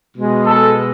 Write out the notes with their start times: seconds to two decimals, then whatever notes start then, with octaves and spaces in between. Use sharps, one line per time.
0.16 B2 G#3
0.47 A4